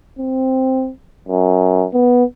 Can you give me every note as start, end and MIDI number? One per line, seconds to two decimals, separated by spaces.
0.19 0.91 60
1.28 1.86 42
1.94 2.24 59